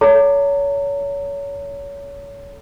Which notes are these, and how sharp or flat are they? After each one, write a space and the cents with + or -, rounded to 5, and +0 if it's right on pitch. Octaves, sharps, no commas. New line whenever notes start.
A4 +0 C#5 +25 A#5 -40